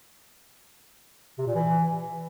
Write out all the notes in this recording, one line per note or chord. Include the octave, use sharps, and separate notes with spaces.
C3
A#2
E3